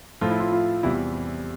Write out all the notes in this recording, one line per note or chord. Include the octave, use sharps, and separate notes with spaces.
A2 F3 F4
E4
F4
F4
E2 C3 G3 E4